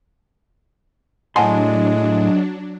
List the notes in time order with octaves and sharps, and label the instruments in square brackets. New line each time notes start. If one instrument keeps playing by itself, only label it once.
[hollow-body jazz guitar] A2 C6 [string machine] F#3 D4 [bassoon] G#3 [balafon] F#5 G#5 A5